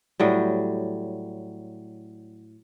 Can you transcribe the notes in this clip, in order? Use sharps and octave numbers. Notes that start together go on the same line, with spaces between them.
A2 F#3 G3